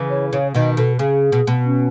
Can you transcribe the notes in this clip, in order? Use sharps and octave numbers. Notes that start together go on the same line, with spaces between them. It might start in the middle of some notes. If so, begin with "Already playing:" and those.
Already playing: C#3 E3
C#5
C#3 C#5
B2 D#3 D#5
B2 A4
C#3 G#4
B2
B2
C#4